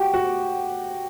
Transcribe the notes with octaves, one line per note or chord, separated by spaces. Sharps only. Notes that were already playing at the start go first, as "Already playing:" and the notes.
Already playing: F#4 G4
F#4